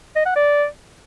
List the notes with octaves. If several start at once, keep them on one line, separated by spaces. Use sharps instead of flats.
D#5
F#5
D5